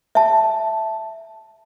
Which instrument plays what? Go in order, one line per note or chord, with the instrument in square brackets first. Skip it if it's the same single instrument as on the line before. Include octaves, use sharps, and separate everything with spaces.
[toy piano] E5 A5